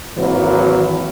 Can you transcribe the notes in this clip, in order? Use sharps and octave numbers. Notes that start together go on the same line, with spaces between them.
G#1 E3 F#3 A#3 F#4 B4